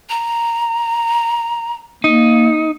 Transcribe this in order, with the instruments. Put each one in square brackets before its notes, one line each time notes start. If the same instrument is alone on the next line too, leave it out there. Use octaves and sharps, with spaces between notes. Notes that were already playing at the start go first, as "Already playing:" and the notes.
[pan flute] A#5
[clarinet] A#3 [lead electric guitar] D#4